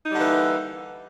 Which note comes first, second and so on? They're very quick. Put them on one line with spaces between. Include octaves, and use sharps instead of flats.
D#4 G3 D3 A#3 E3